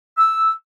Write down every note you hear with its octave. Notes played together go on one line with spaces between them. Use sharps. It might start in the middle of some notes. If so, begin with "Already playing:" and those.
E6